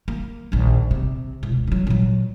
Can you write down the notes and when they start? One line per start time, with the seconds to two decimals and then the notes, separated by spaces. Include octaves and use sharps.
0.08 A#3
0.52 A#1 D#2
0.91 C3
1.43 E1 C#2
1.67 D3 F#3
1.87 A#2 F#3